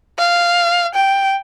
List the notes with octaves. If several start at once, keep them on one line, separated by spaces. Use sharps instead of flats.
F5
G5